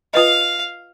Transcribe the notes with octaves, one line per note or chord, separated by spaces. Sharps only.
F4 B4 D#5 F5